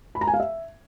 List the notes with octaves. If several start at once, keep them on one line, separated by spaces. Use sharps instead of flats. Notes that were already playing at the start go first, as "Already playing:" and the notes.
B5
A#5
G#5
F5
E5